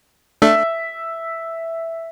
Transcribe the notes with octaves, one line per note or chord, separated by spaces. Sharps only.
A3 D4 E5